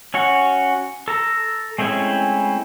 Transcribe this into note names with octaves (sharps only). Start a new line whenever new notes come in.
C#4 F#4 C#5
A4 A#5
G#3 A3 C4 C#4 E4